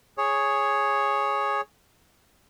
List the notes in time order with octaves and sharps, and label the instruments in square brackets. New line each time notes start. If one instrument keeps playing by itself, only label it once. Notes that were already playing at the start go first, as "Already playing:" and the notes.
[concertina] G#4 C#5